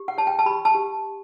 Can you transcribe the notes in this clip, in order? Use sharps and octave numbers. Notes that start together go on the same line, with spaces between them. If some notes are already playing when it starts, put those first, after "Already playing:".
Already playing: G4
F#5
C#5 A5
G5
A5
G4 B5
A5
G4